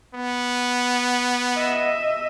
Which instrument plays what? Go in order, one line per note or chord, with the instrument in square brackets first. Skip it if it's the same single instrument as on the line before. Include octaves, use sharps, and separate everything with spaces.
[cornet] B3
[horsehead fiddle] D#5 E5